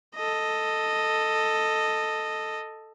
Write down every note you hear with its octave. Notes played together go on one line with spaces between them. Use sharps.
A4 D#5